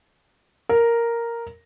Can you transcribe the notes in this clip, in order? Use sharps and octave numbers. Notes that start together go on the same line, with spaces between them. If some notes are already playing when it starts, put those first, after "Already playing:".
A#4